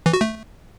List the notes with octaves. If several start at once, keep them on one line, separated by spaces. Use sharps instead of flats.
E3
F#4
A3